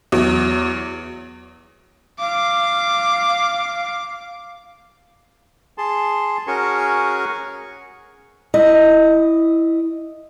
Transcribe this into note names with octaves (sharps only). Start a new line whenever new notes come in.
E2 F#3
F5 D6
G#4 A5 C6
C#4 F#4 G#4 A#4 G#5 C#6
E4 D#5